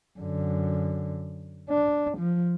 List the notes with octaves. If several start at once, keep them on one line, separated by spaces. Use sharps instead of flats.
F#2 D3
D4
F3